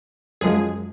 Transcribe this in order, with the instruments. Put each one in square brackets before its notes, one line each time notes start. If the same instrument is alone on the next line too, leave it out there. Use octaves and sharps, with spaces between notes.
[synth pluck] F#2 F3 G#3 G#4